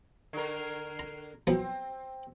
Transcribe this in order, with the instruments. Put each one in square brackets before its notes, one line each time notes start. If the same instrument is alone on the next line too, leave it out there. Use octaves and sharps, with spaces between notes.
[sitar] D3 A#4
[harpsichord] A#5
[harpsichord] F3 F#3 B3 [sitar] C4